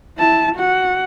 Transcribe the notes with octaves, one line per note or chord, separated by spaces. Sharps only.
E4 A5
F#4 F#5